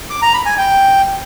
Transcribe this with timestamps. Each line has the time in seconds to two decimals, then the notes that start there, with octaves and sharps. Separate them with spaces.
0.10 D6
0.22 A#5
0.34 B5
0.46 G#5
0.58 G5